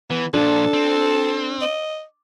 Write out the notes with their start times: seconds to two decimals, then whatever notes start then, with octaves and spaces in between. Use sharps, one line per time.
0.10 E3 B3
0.34 A#2 F3 D4 A4
0.73 C4
1.62 D#5